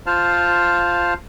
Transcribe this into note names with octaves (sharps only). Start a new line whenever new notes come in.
F4 C5 F5 A5 F6